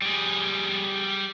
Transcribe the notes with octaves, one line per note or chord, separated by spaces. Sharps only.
G3 G#4